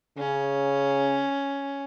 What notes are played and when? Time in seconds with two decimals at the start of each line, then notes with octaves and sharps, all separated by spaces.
0.18 C#3 C#4